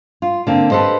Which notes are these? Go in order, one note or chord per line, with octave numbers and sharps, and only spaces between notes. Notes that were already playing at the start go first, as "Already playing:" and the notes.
F4
D3 A#3 C4
G4 A4 B4 C5 D#5